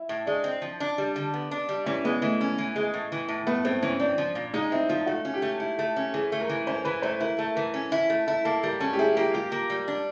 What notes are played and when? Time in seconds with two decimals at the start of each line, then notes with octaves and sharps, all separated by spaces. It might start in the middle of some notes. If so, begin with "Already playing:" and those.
Already playing: E4
0.09 A2
0.26 G#3 D4
0.44 C4
0.62 F3
0.80 D4
0.98 G3
1.16 D3
1.34 B3
1.51 D4
1.69 G3
1.86 E3 C#4
2.04 G#3 B3
2.22 E3 A3
2.41 C#4
2.58 E3
2.76 G#3
2.94 A2
3.12 E3
3.28 A2
3.47 A3 B3
3.65 A2 C4
3.83 E3 C#4
4.00 C4 D4
4.18 F3
4.35 A#2
4.54 G#3 D#4
4.72 C4 E4
4.89 F3 F4
5.06 A3 F#4
5.25 C#4
5.34 G4
5.42 A3
5.60 E4
5.79 A3
5.96 C#4
6.14 E3 G#4
6.32 A3
6.41 A#4
6.49 E3
6.67 C#4 C5
6.85 E3 B4
7.02 A3 C5
7.20 E4 A#4
7.38 A3 A4
7.55 E3 A#4
7.74 C#4
7.92 E4
8.10 A3
8.27 E4 A4
8.45 A#3 A4
8.63 G3 A#4
8.80 C#4 A4
8.93 G4
8.99 E4 G#4
9.17 A#3 G4
9.34 F4 G4
9.52 A#3
9.70 G3
9.88 D4